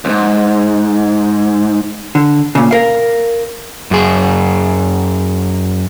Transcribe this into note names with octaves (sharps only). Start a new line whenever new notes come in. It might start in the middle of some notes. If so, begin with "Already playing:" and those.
C#2 G#2
D3
A#2 C#3
A#4 F5
F#2 G#4